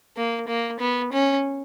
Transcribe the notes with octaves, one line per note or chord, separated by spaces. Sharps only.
A#3
A#3
B3
C#4